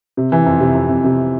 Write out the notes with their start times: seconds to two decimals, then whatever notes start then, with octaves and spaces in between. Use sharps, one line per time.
0.17 C3
0.32 E3
0.46 F2
0.61 C3
0.75 F2
0.89 F2
1.04 C3